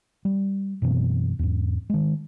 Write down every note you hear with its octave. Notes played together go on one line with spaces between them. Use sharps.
G3
F#2 B2 E3 C4
E2 G#2
D#3 G#3